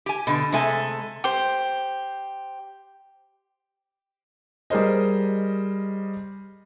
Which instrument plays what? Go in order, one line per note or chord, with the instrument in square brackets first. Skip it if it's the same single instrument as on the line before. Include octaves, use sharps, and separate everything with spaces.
[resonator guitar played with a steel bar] G4 G#5
B2 D3
C3 G#3 A3 A4 G#5
[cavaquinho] G4 C5
[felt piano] G3 G#4 A#4 C5 D#5